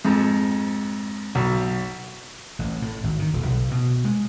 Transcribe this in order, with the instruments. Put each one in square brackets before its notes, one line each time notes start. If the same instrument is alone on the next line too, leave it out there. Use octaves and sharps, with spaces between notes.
[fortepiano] F2 G#2
B1
[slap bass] A1
A2
G#1
D#3
D#1
B1
B2
G#3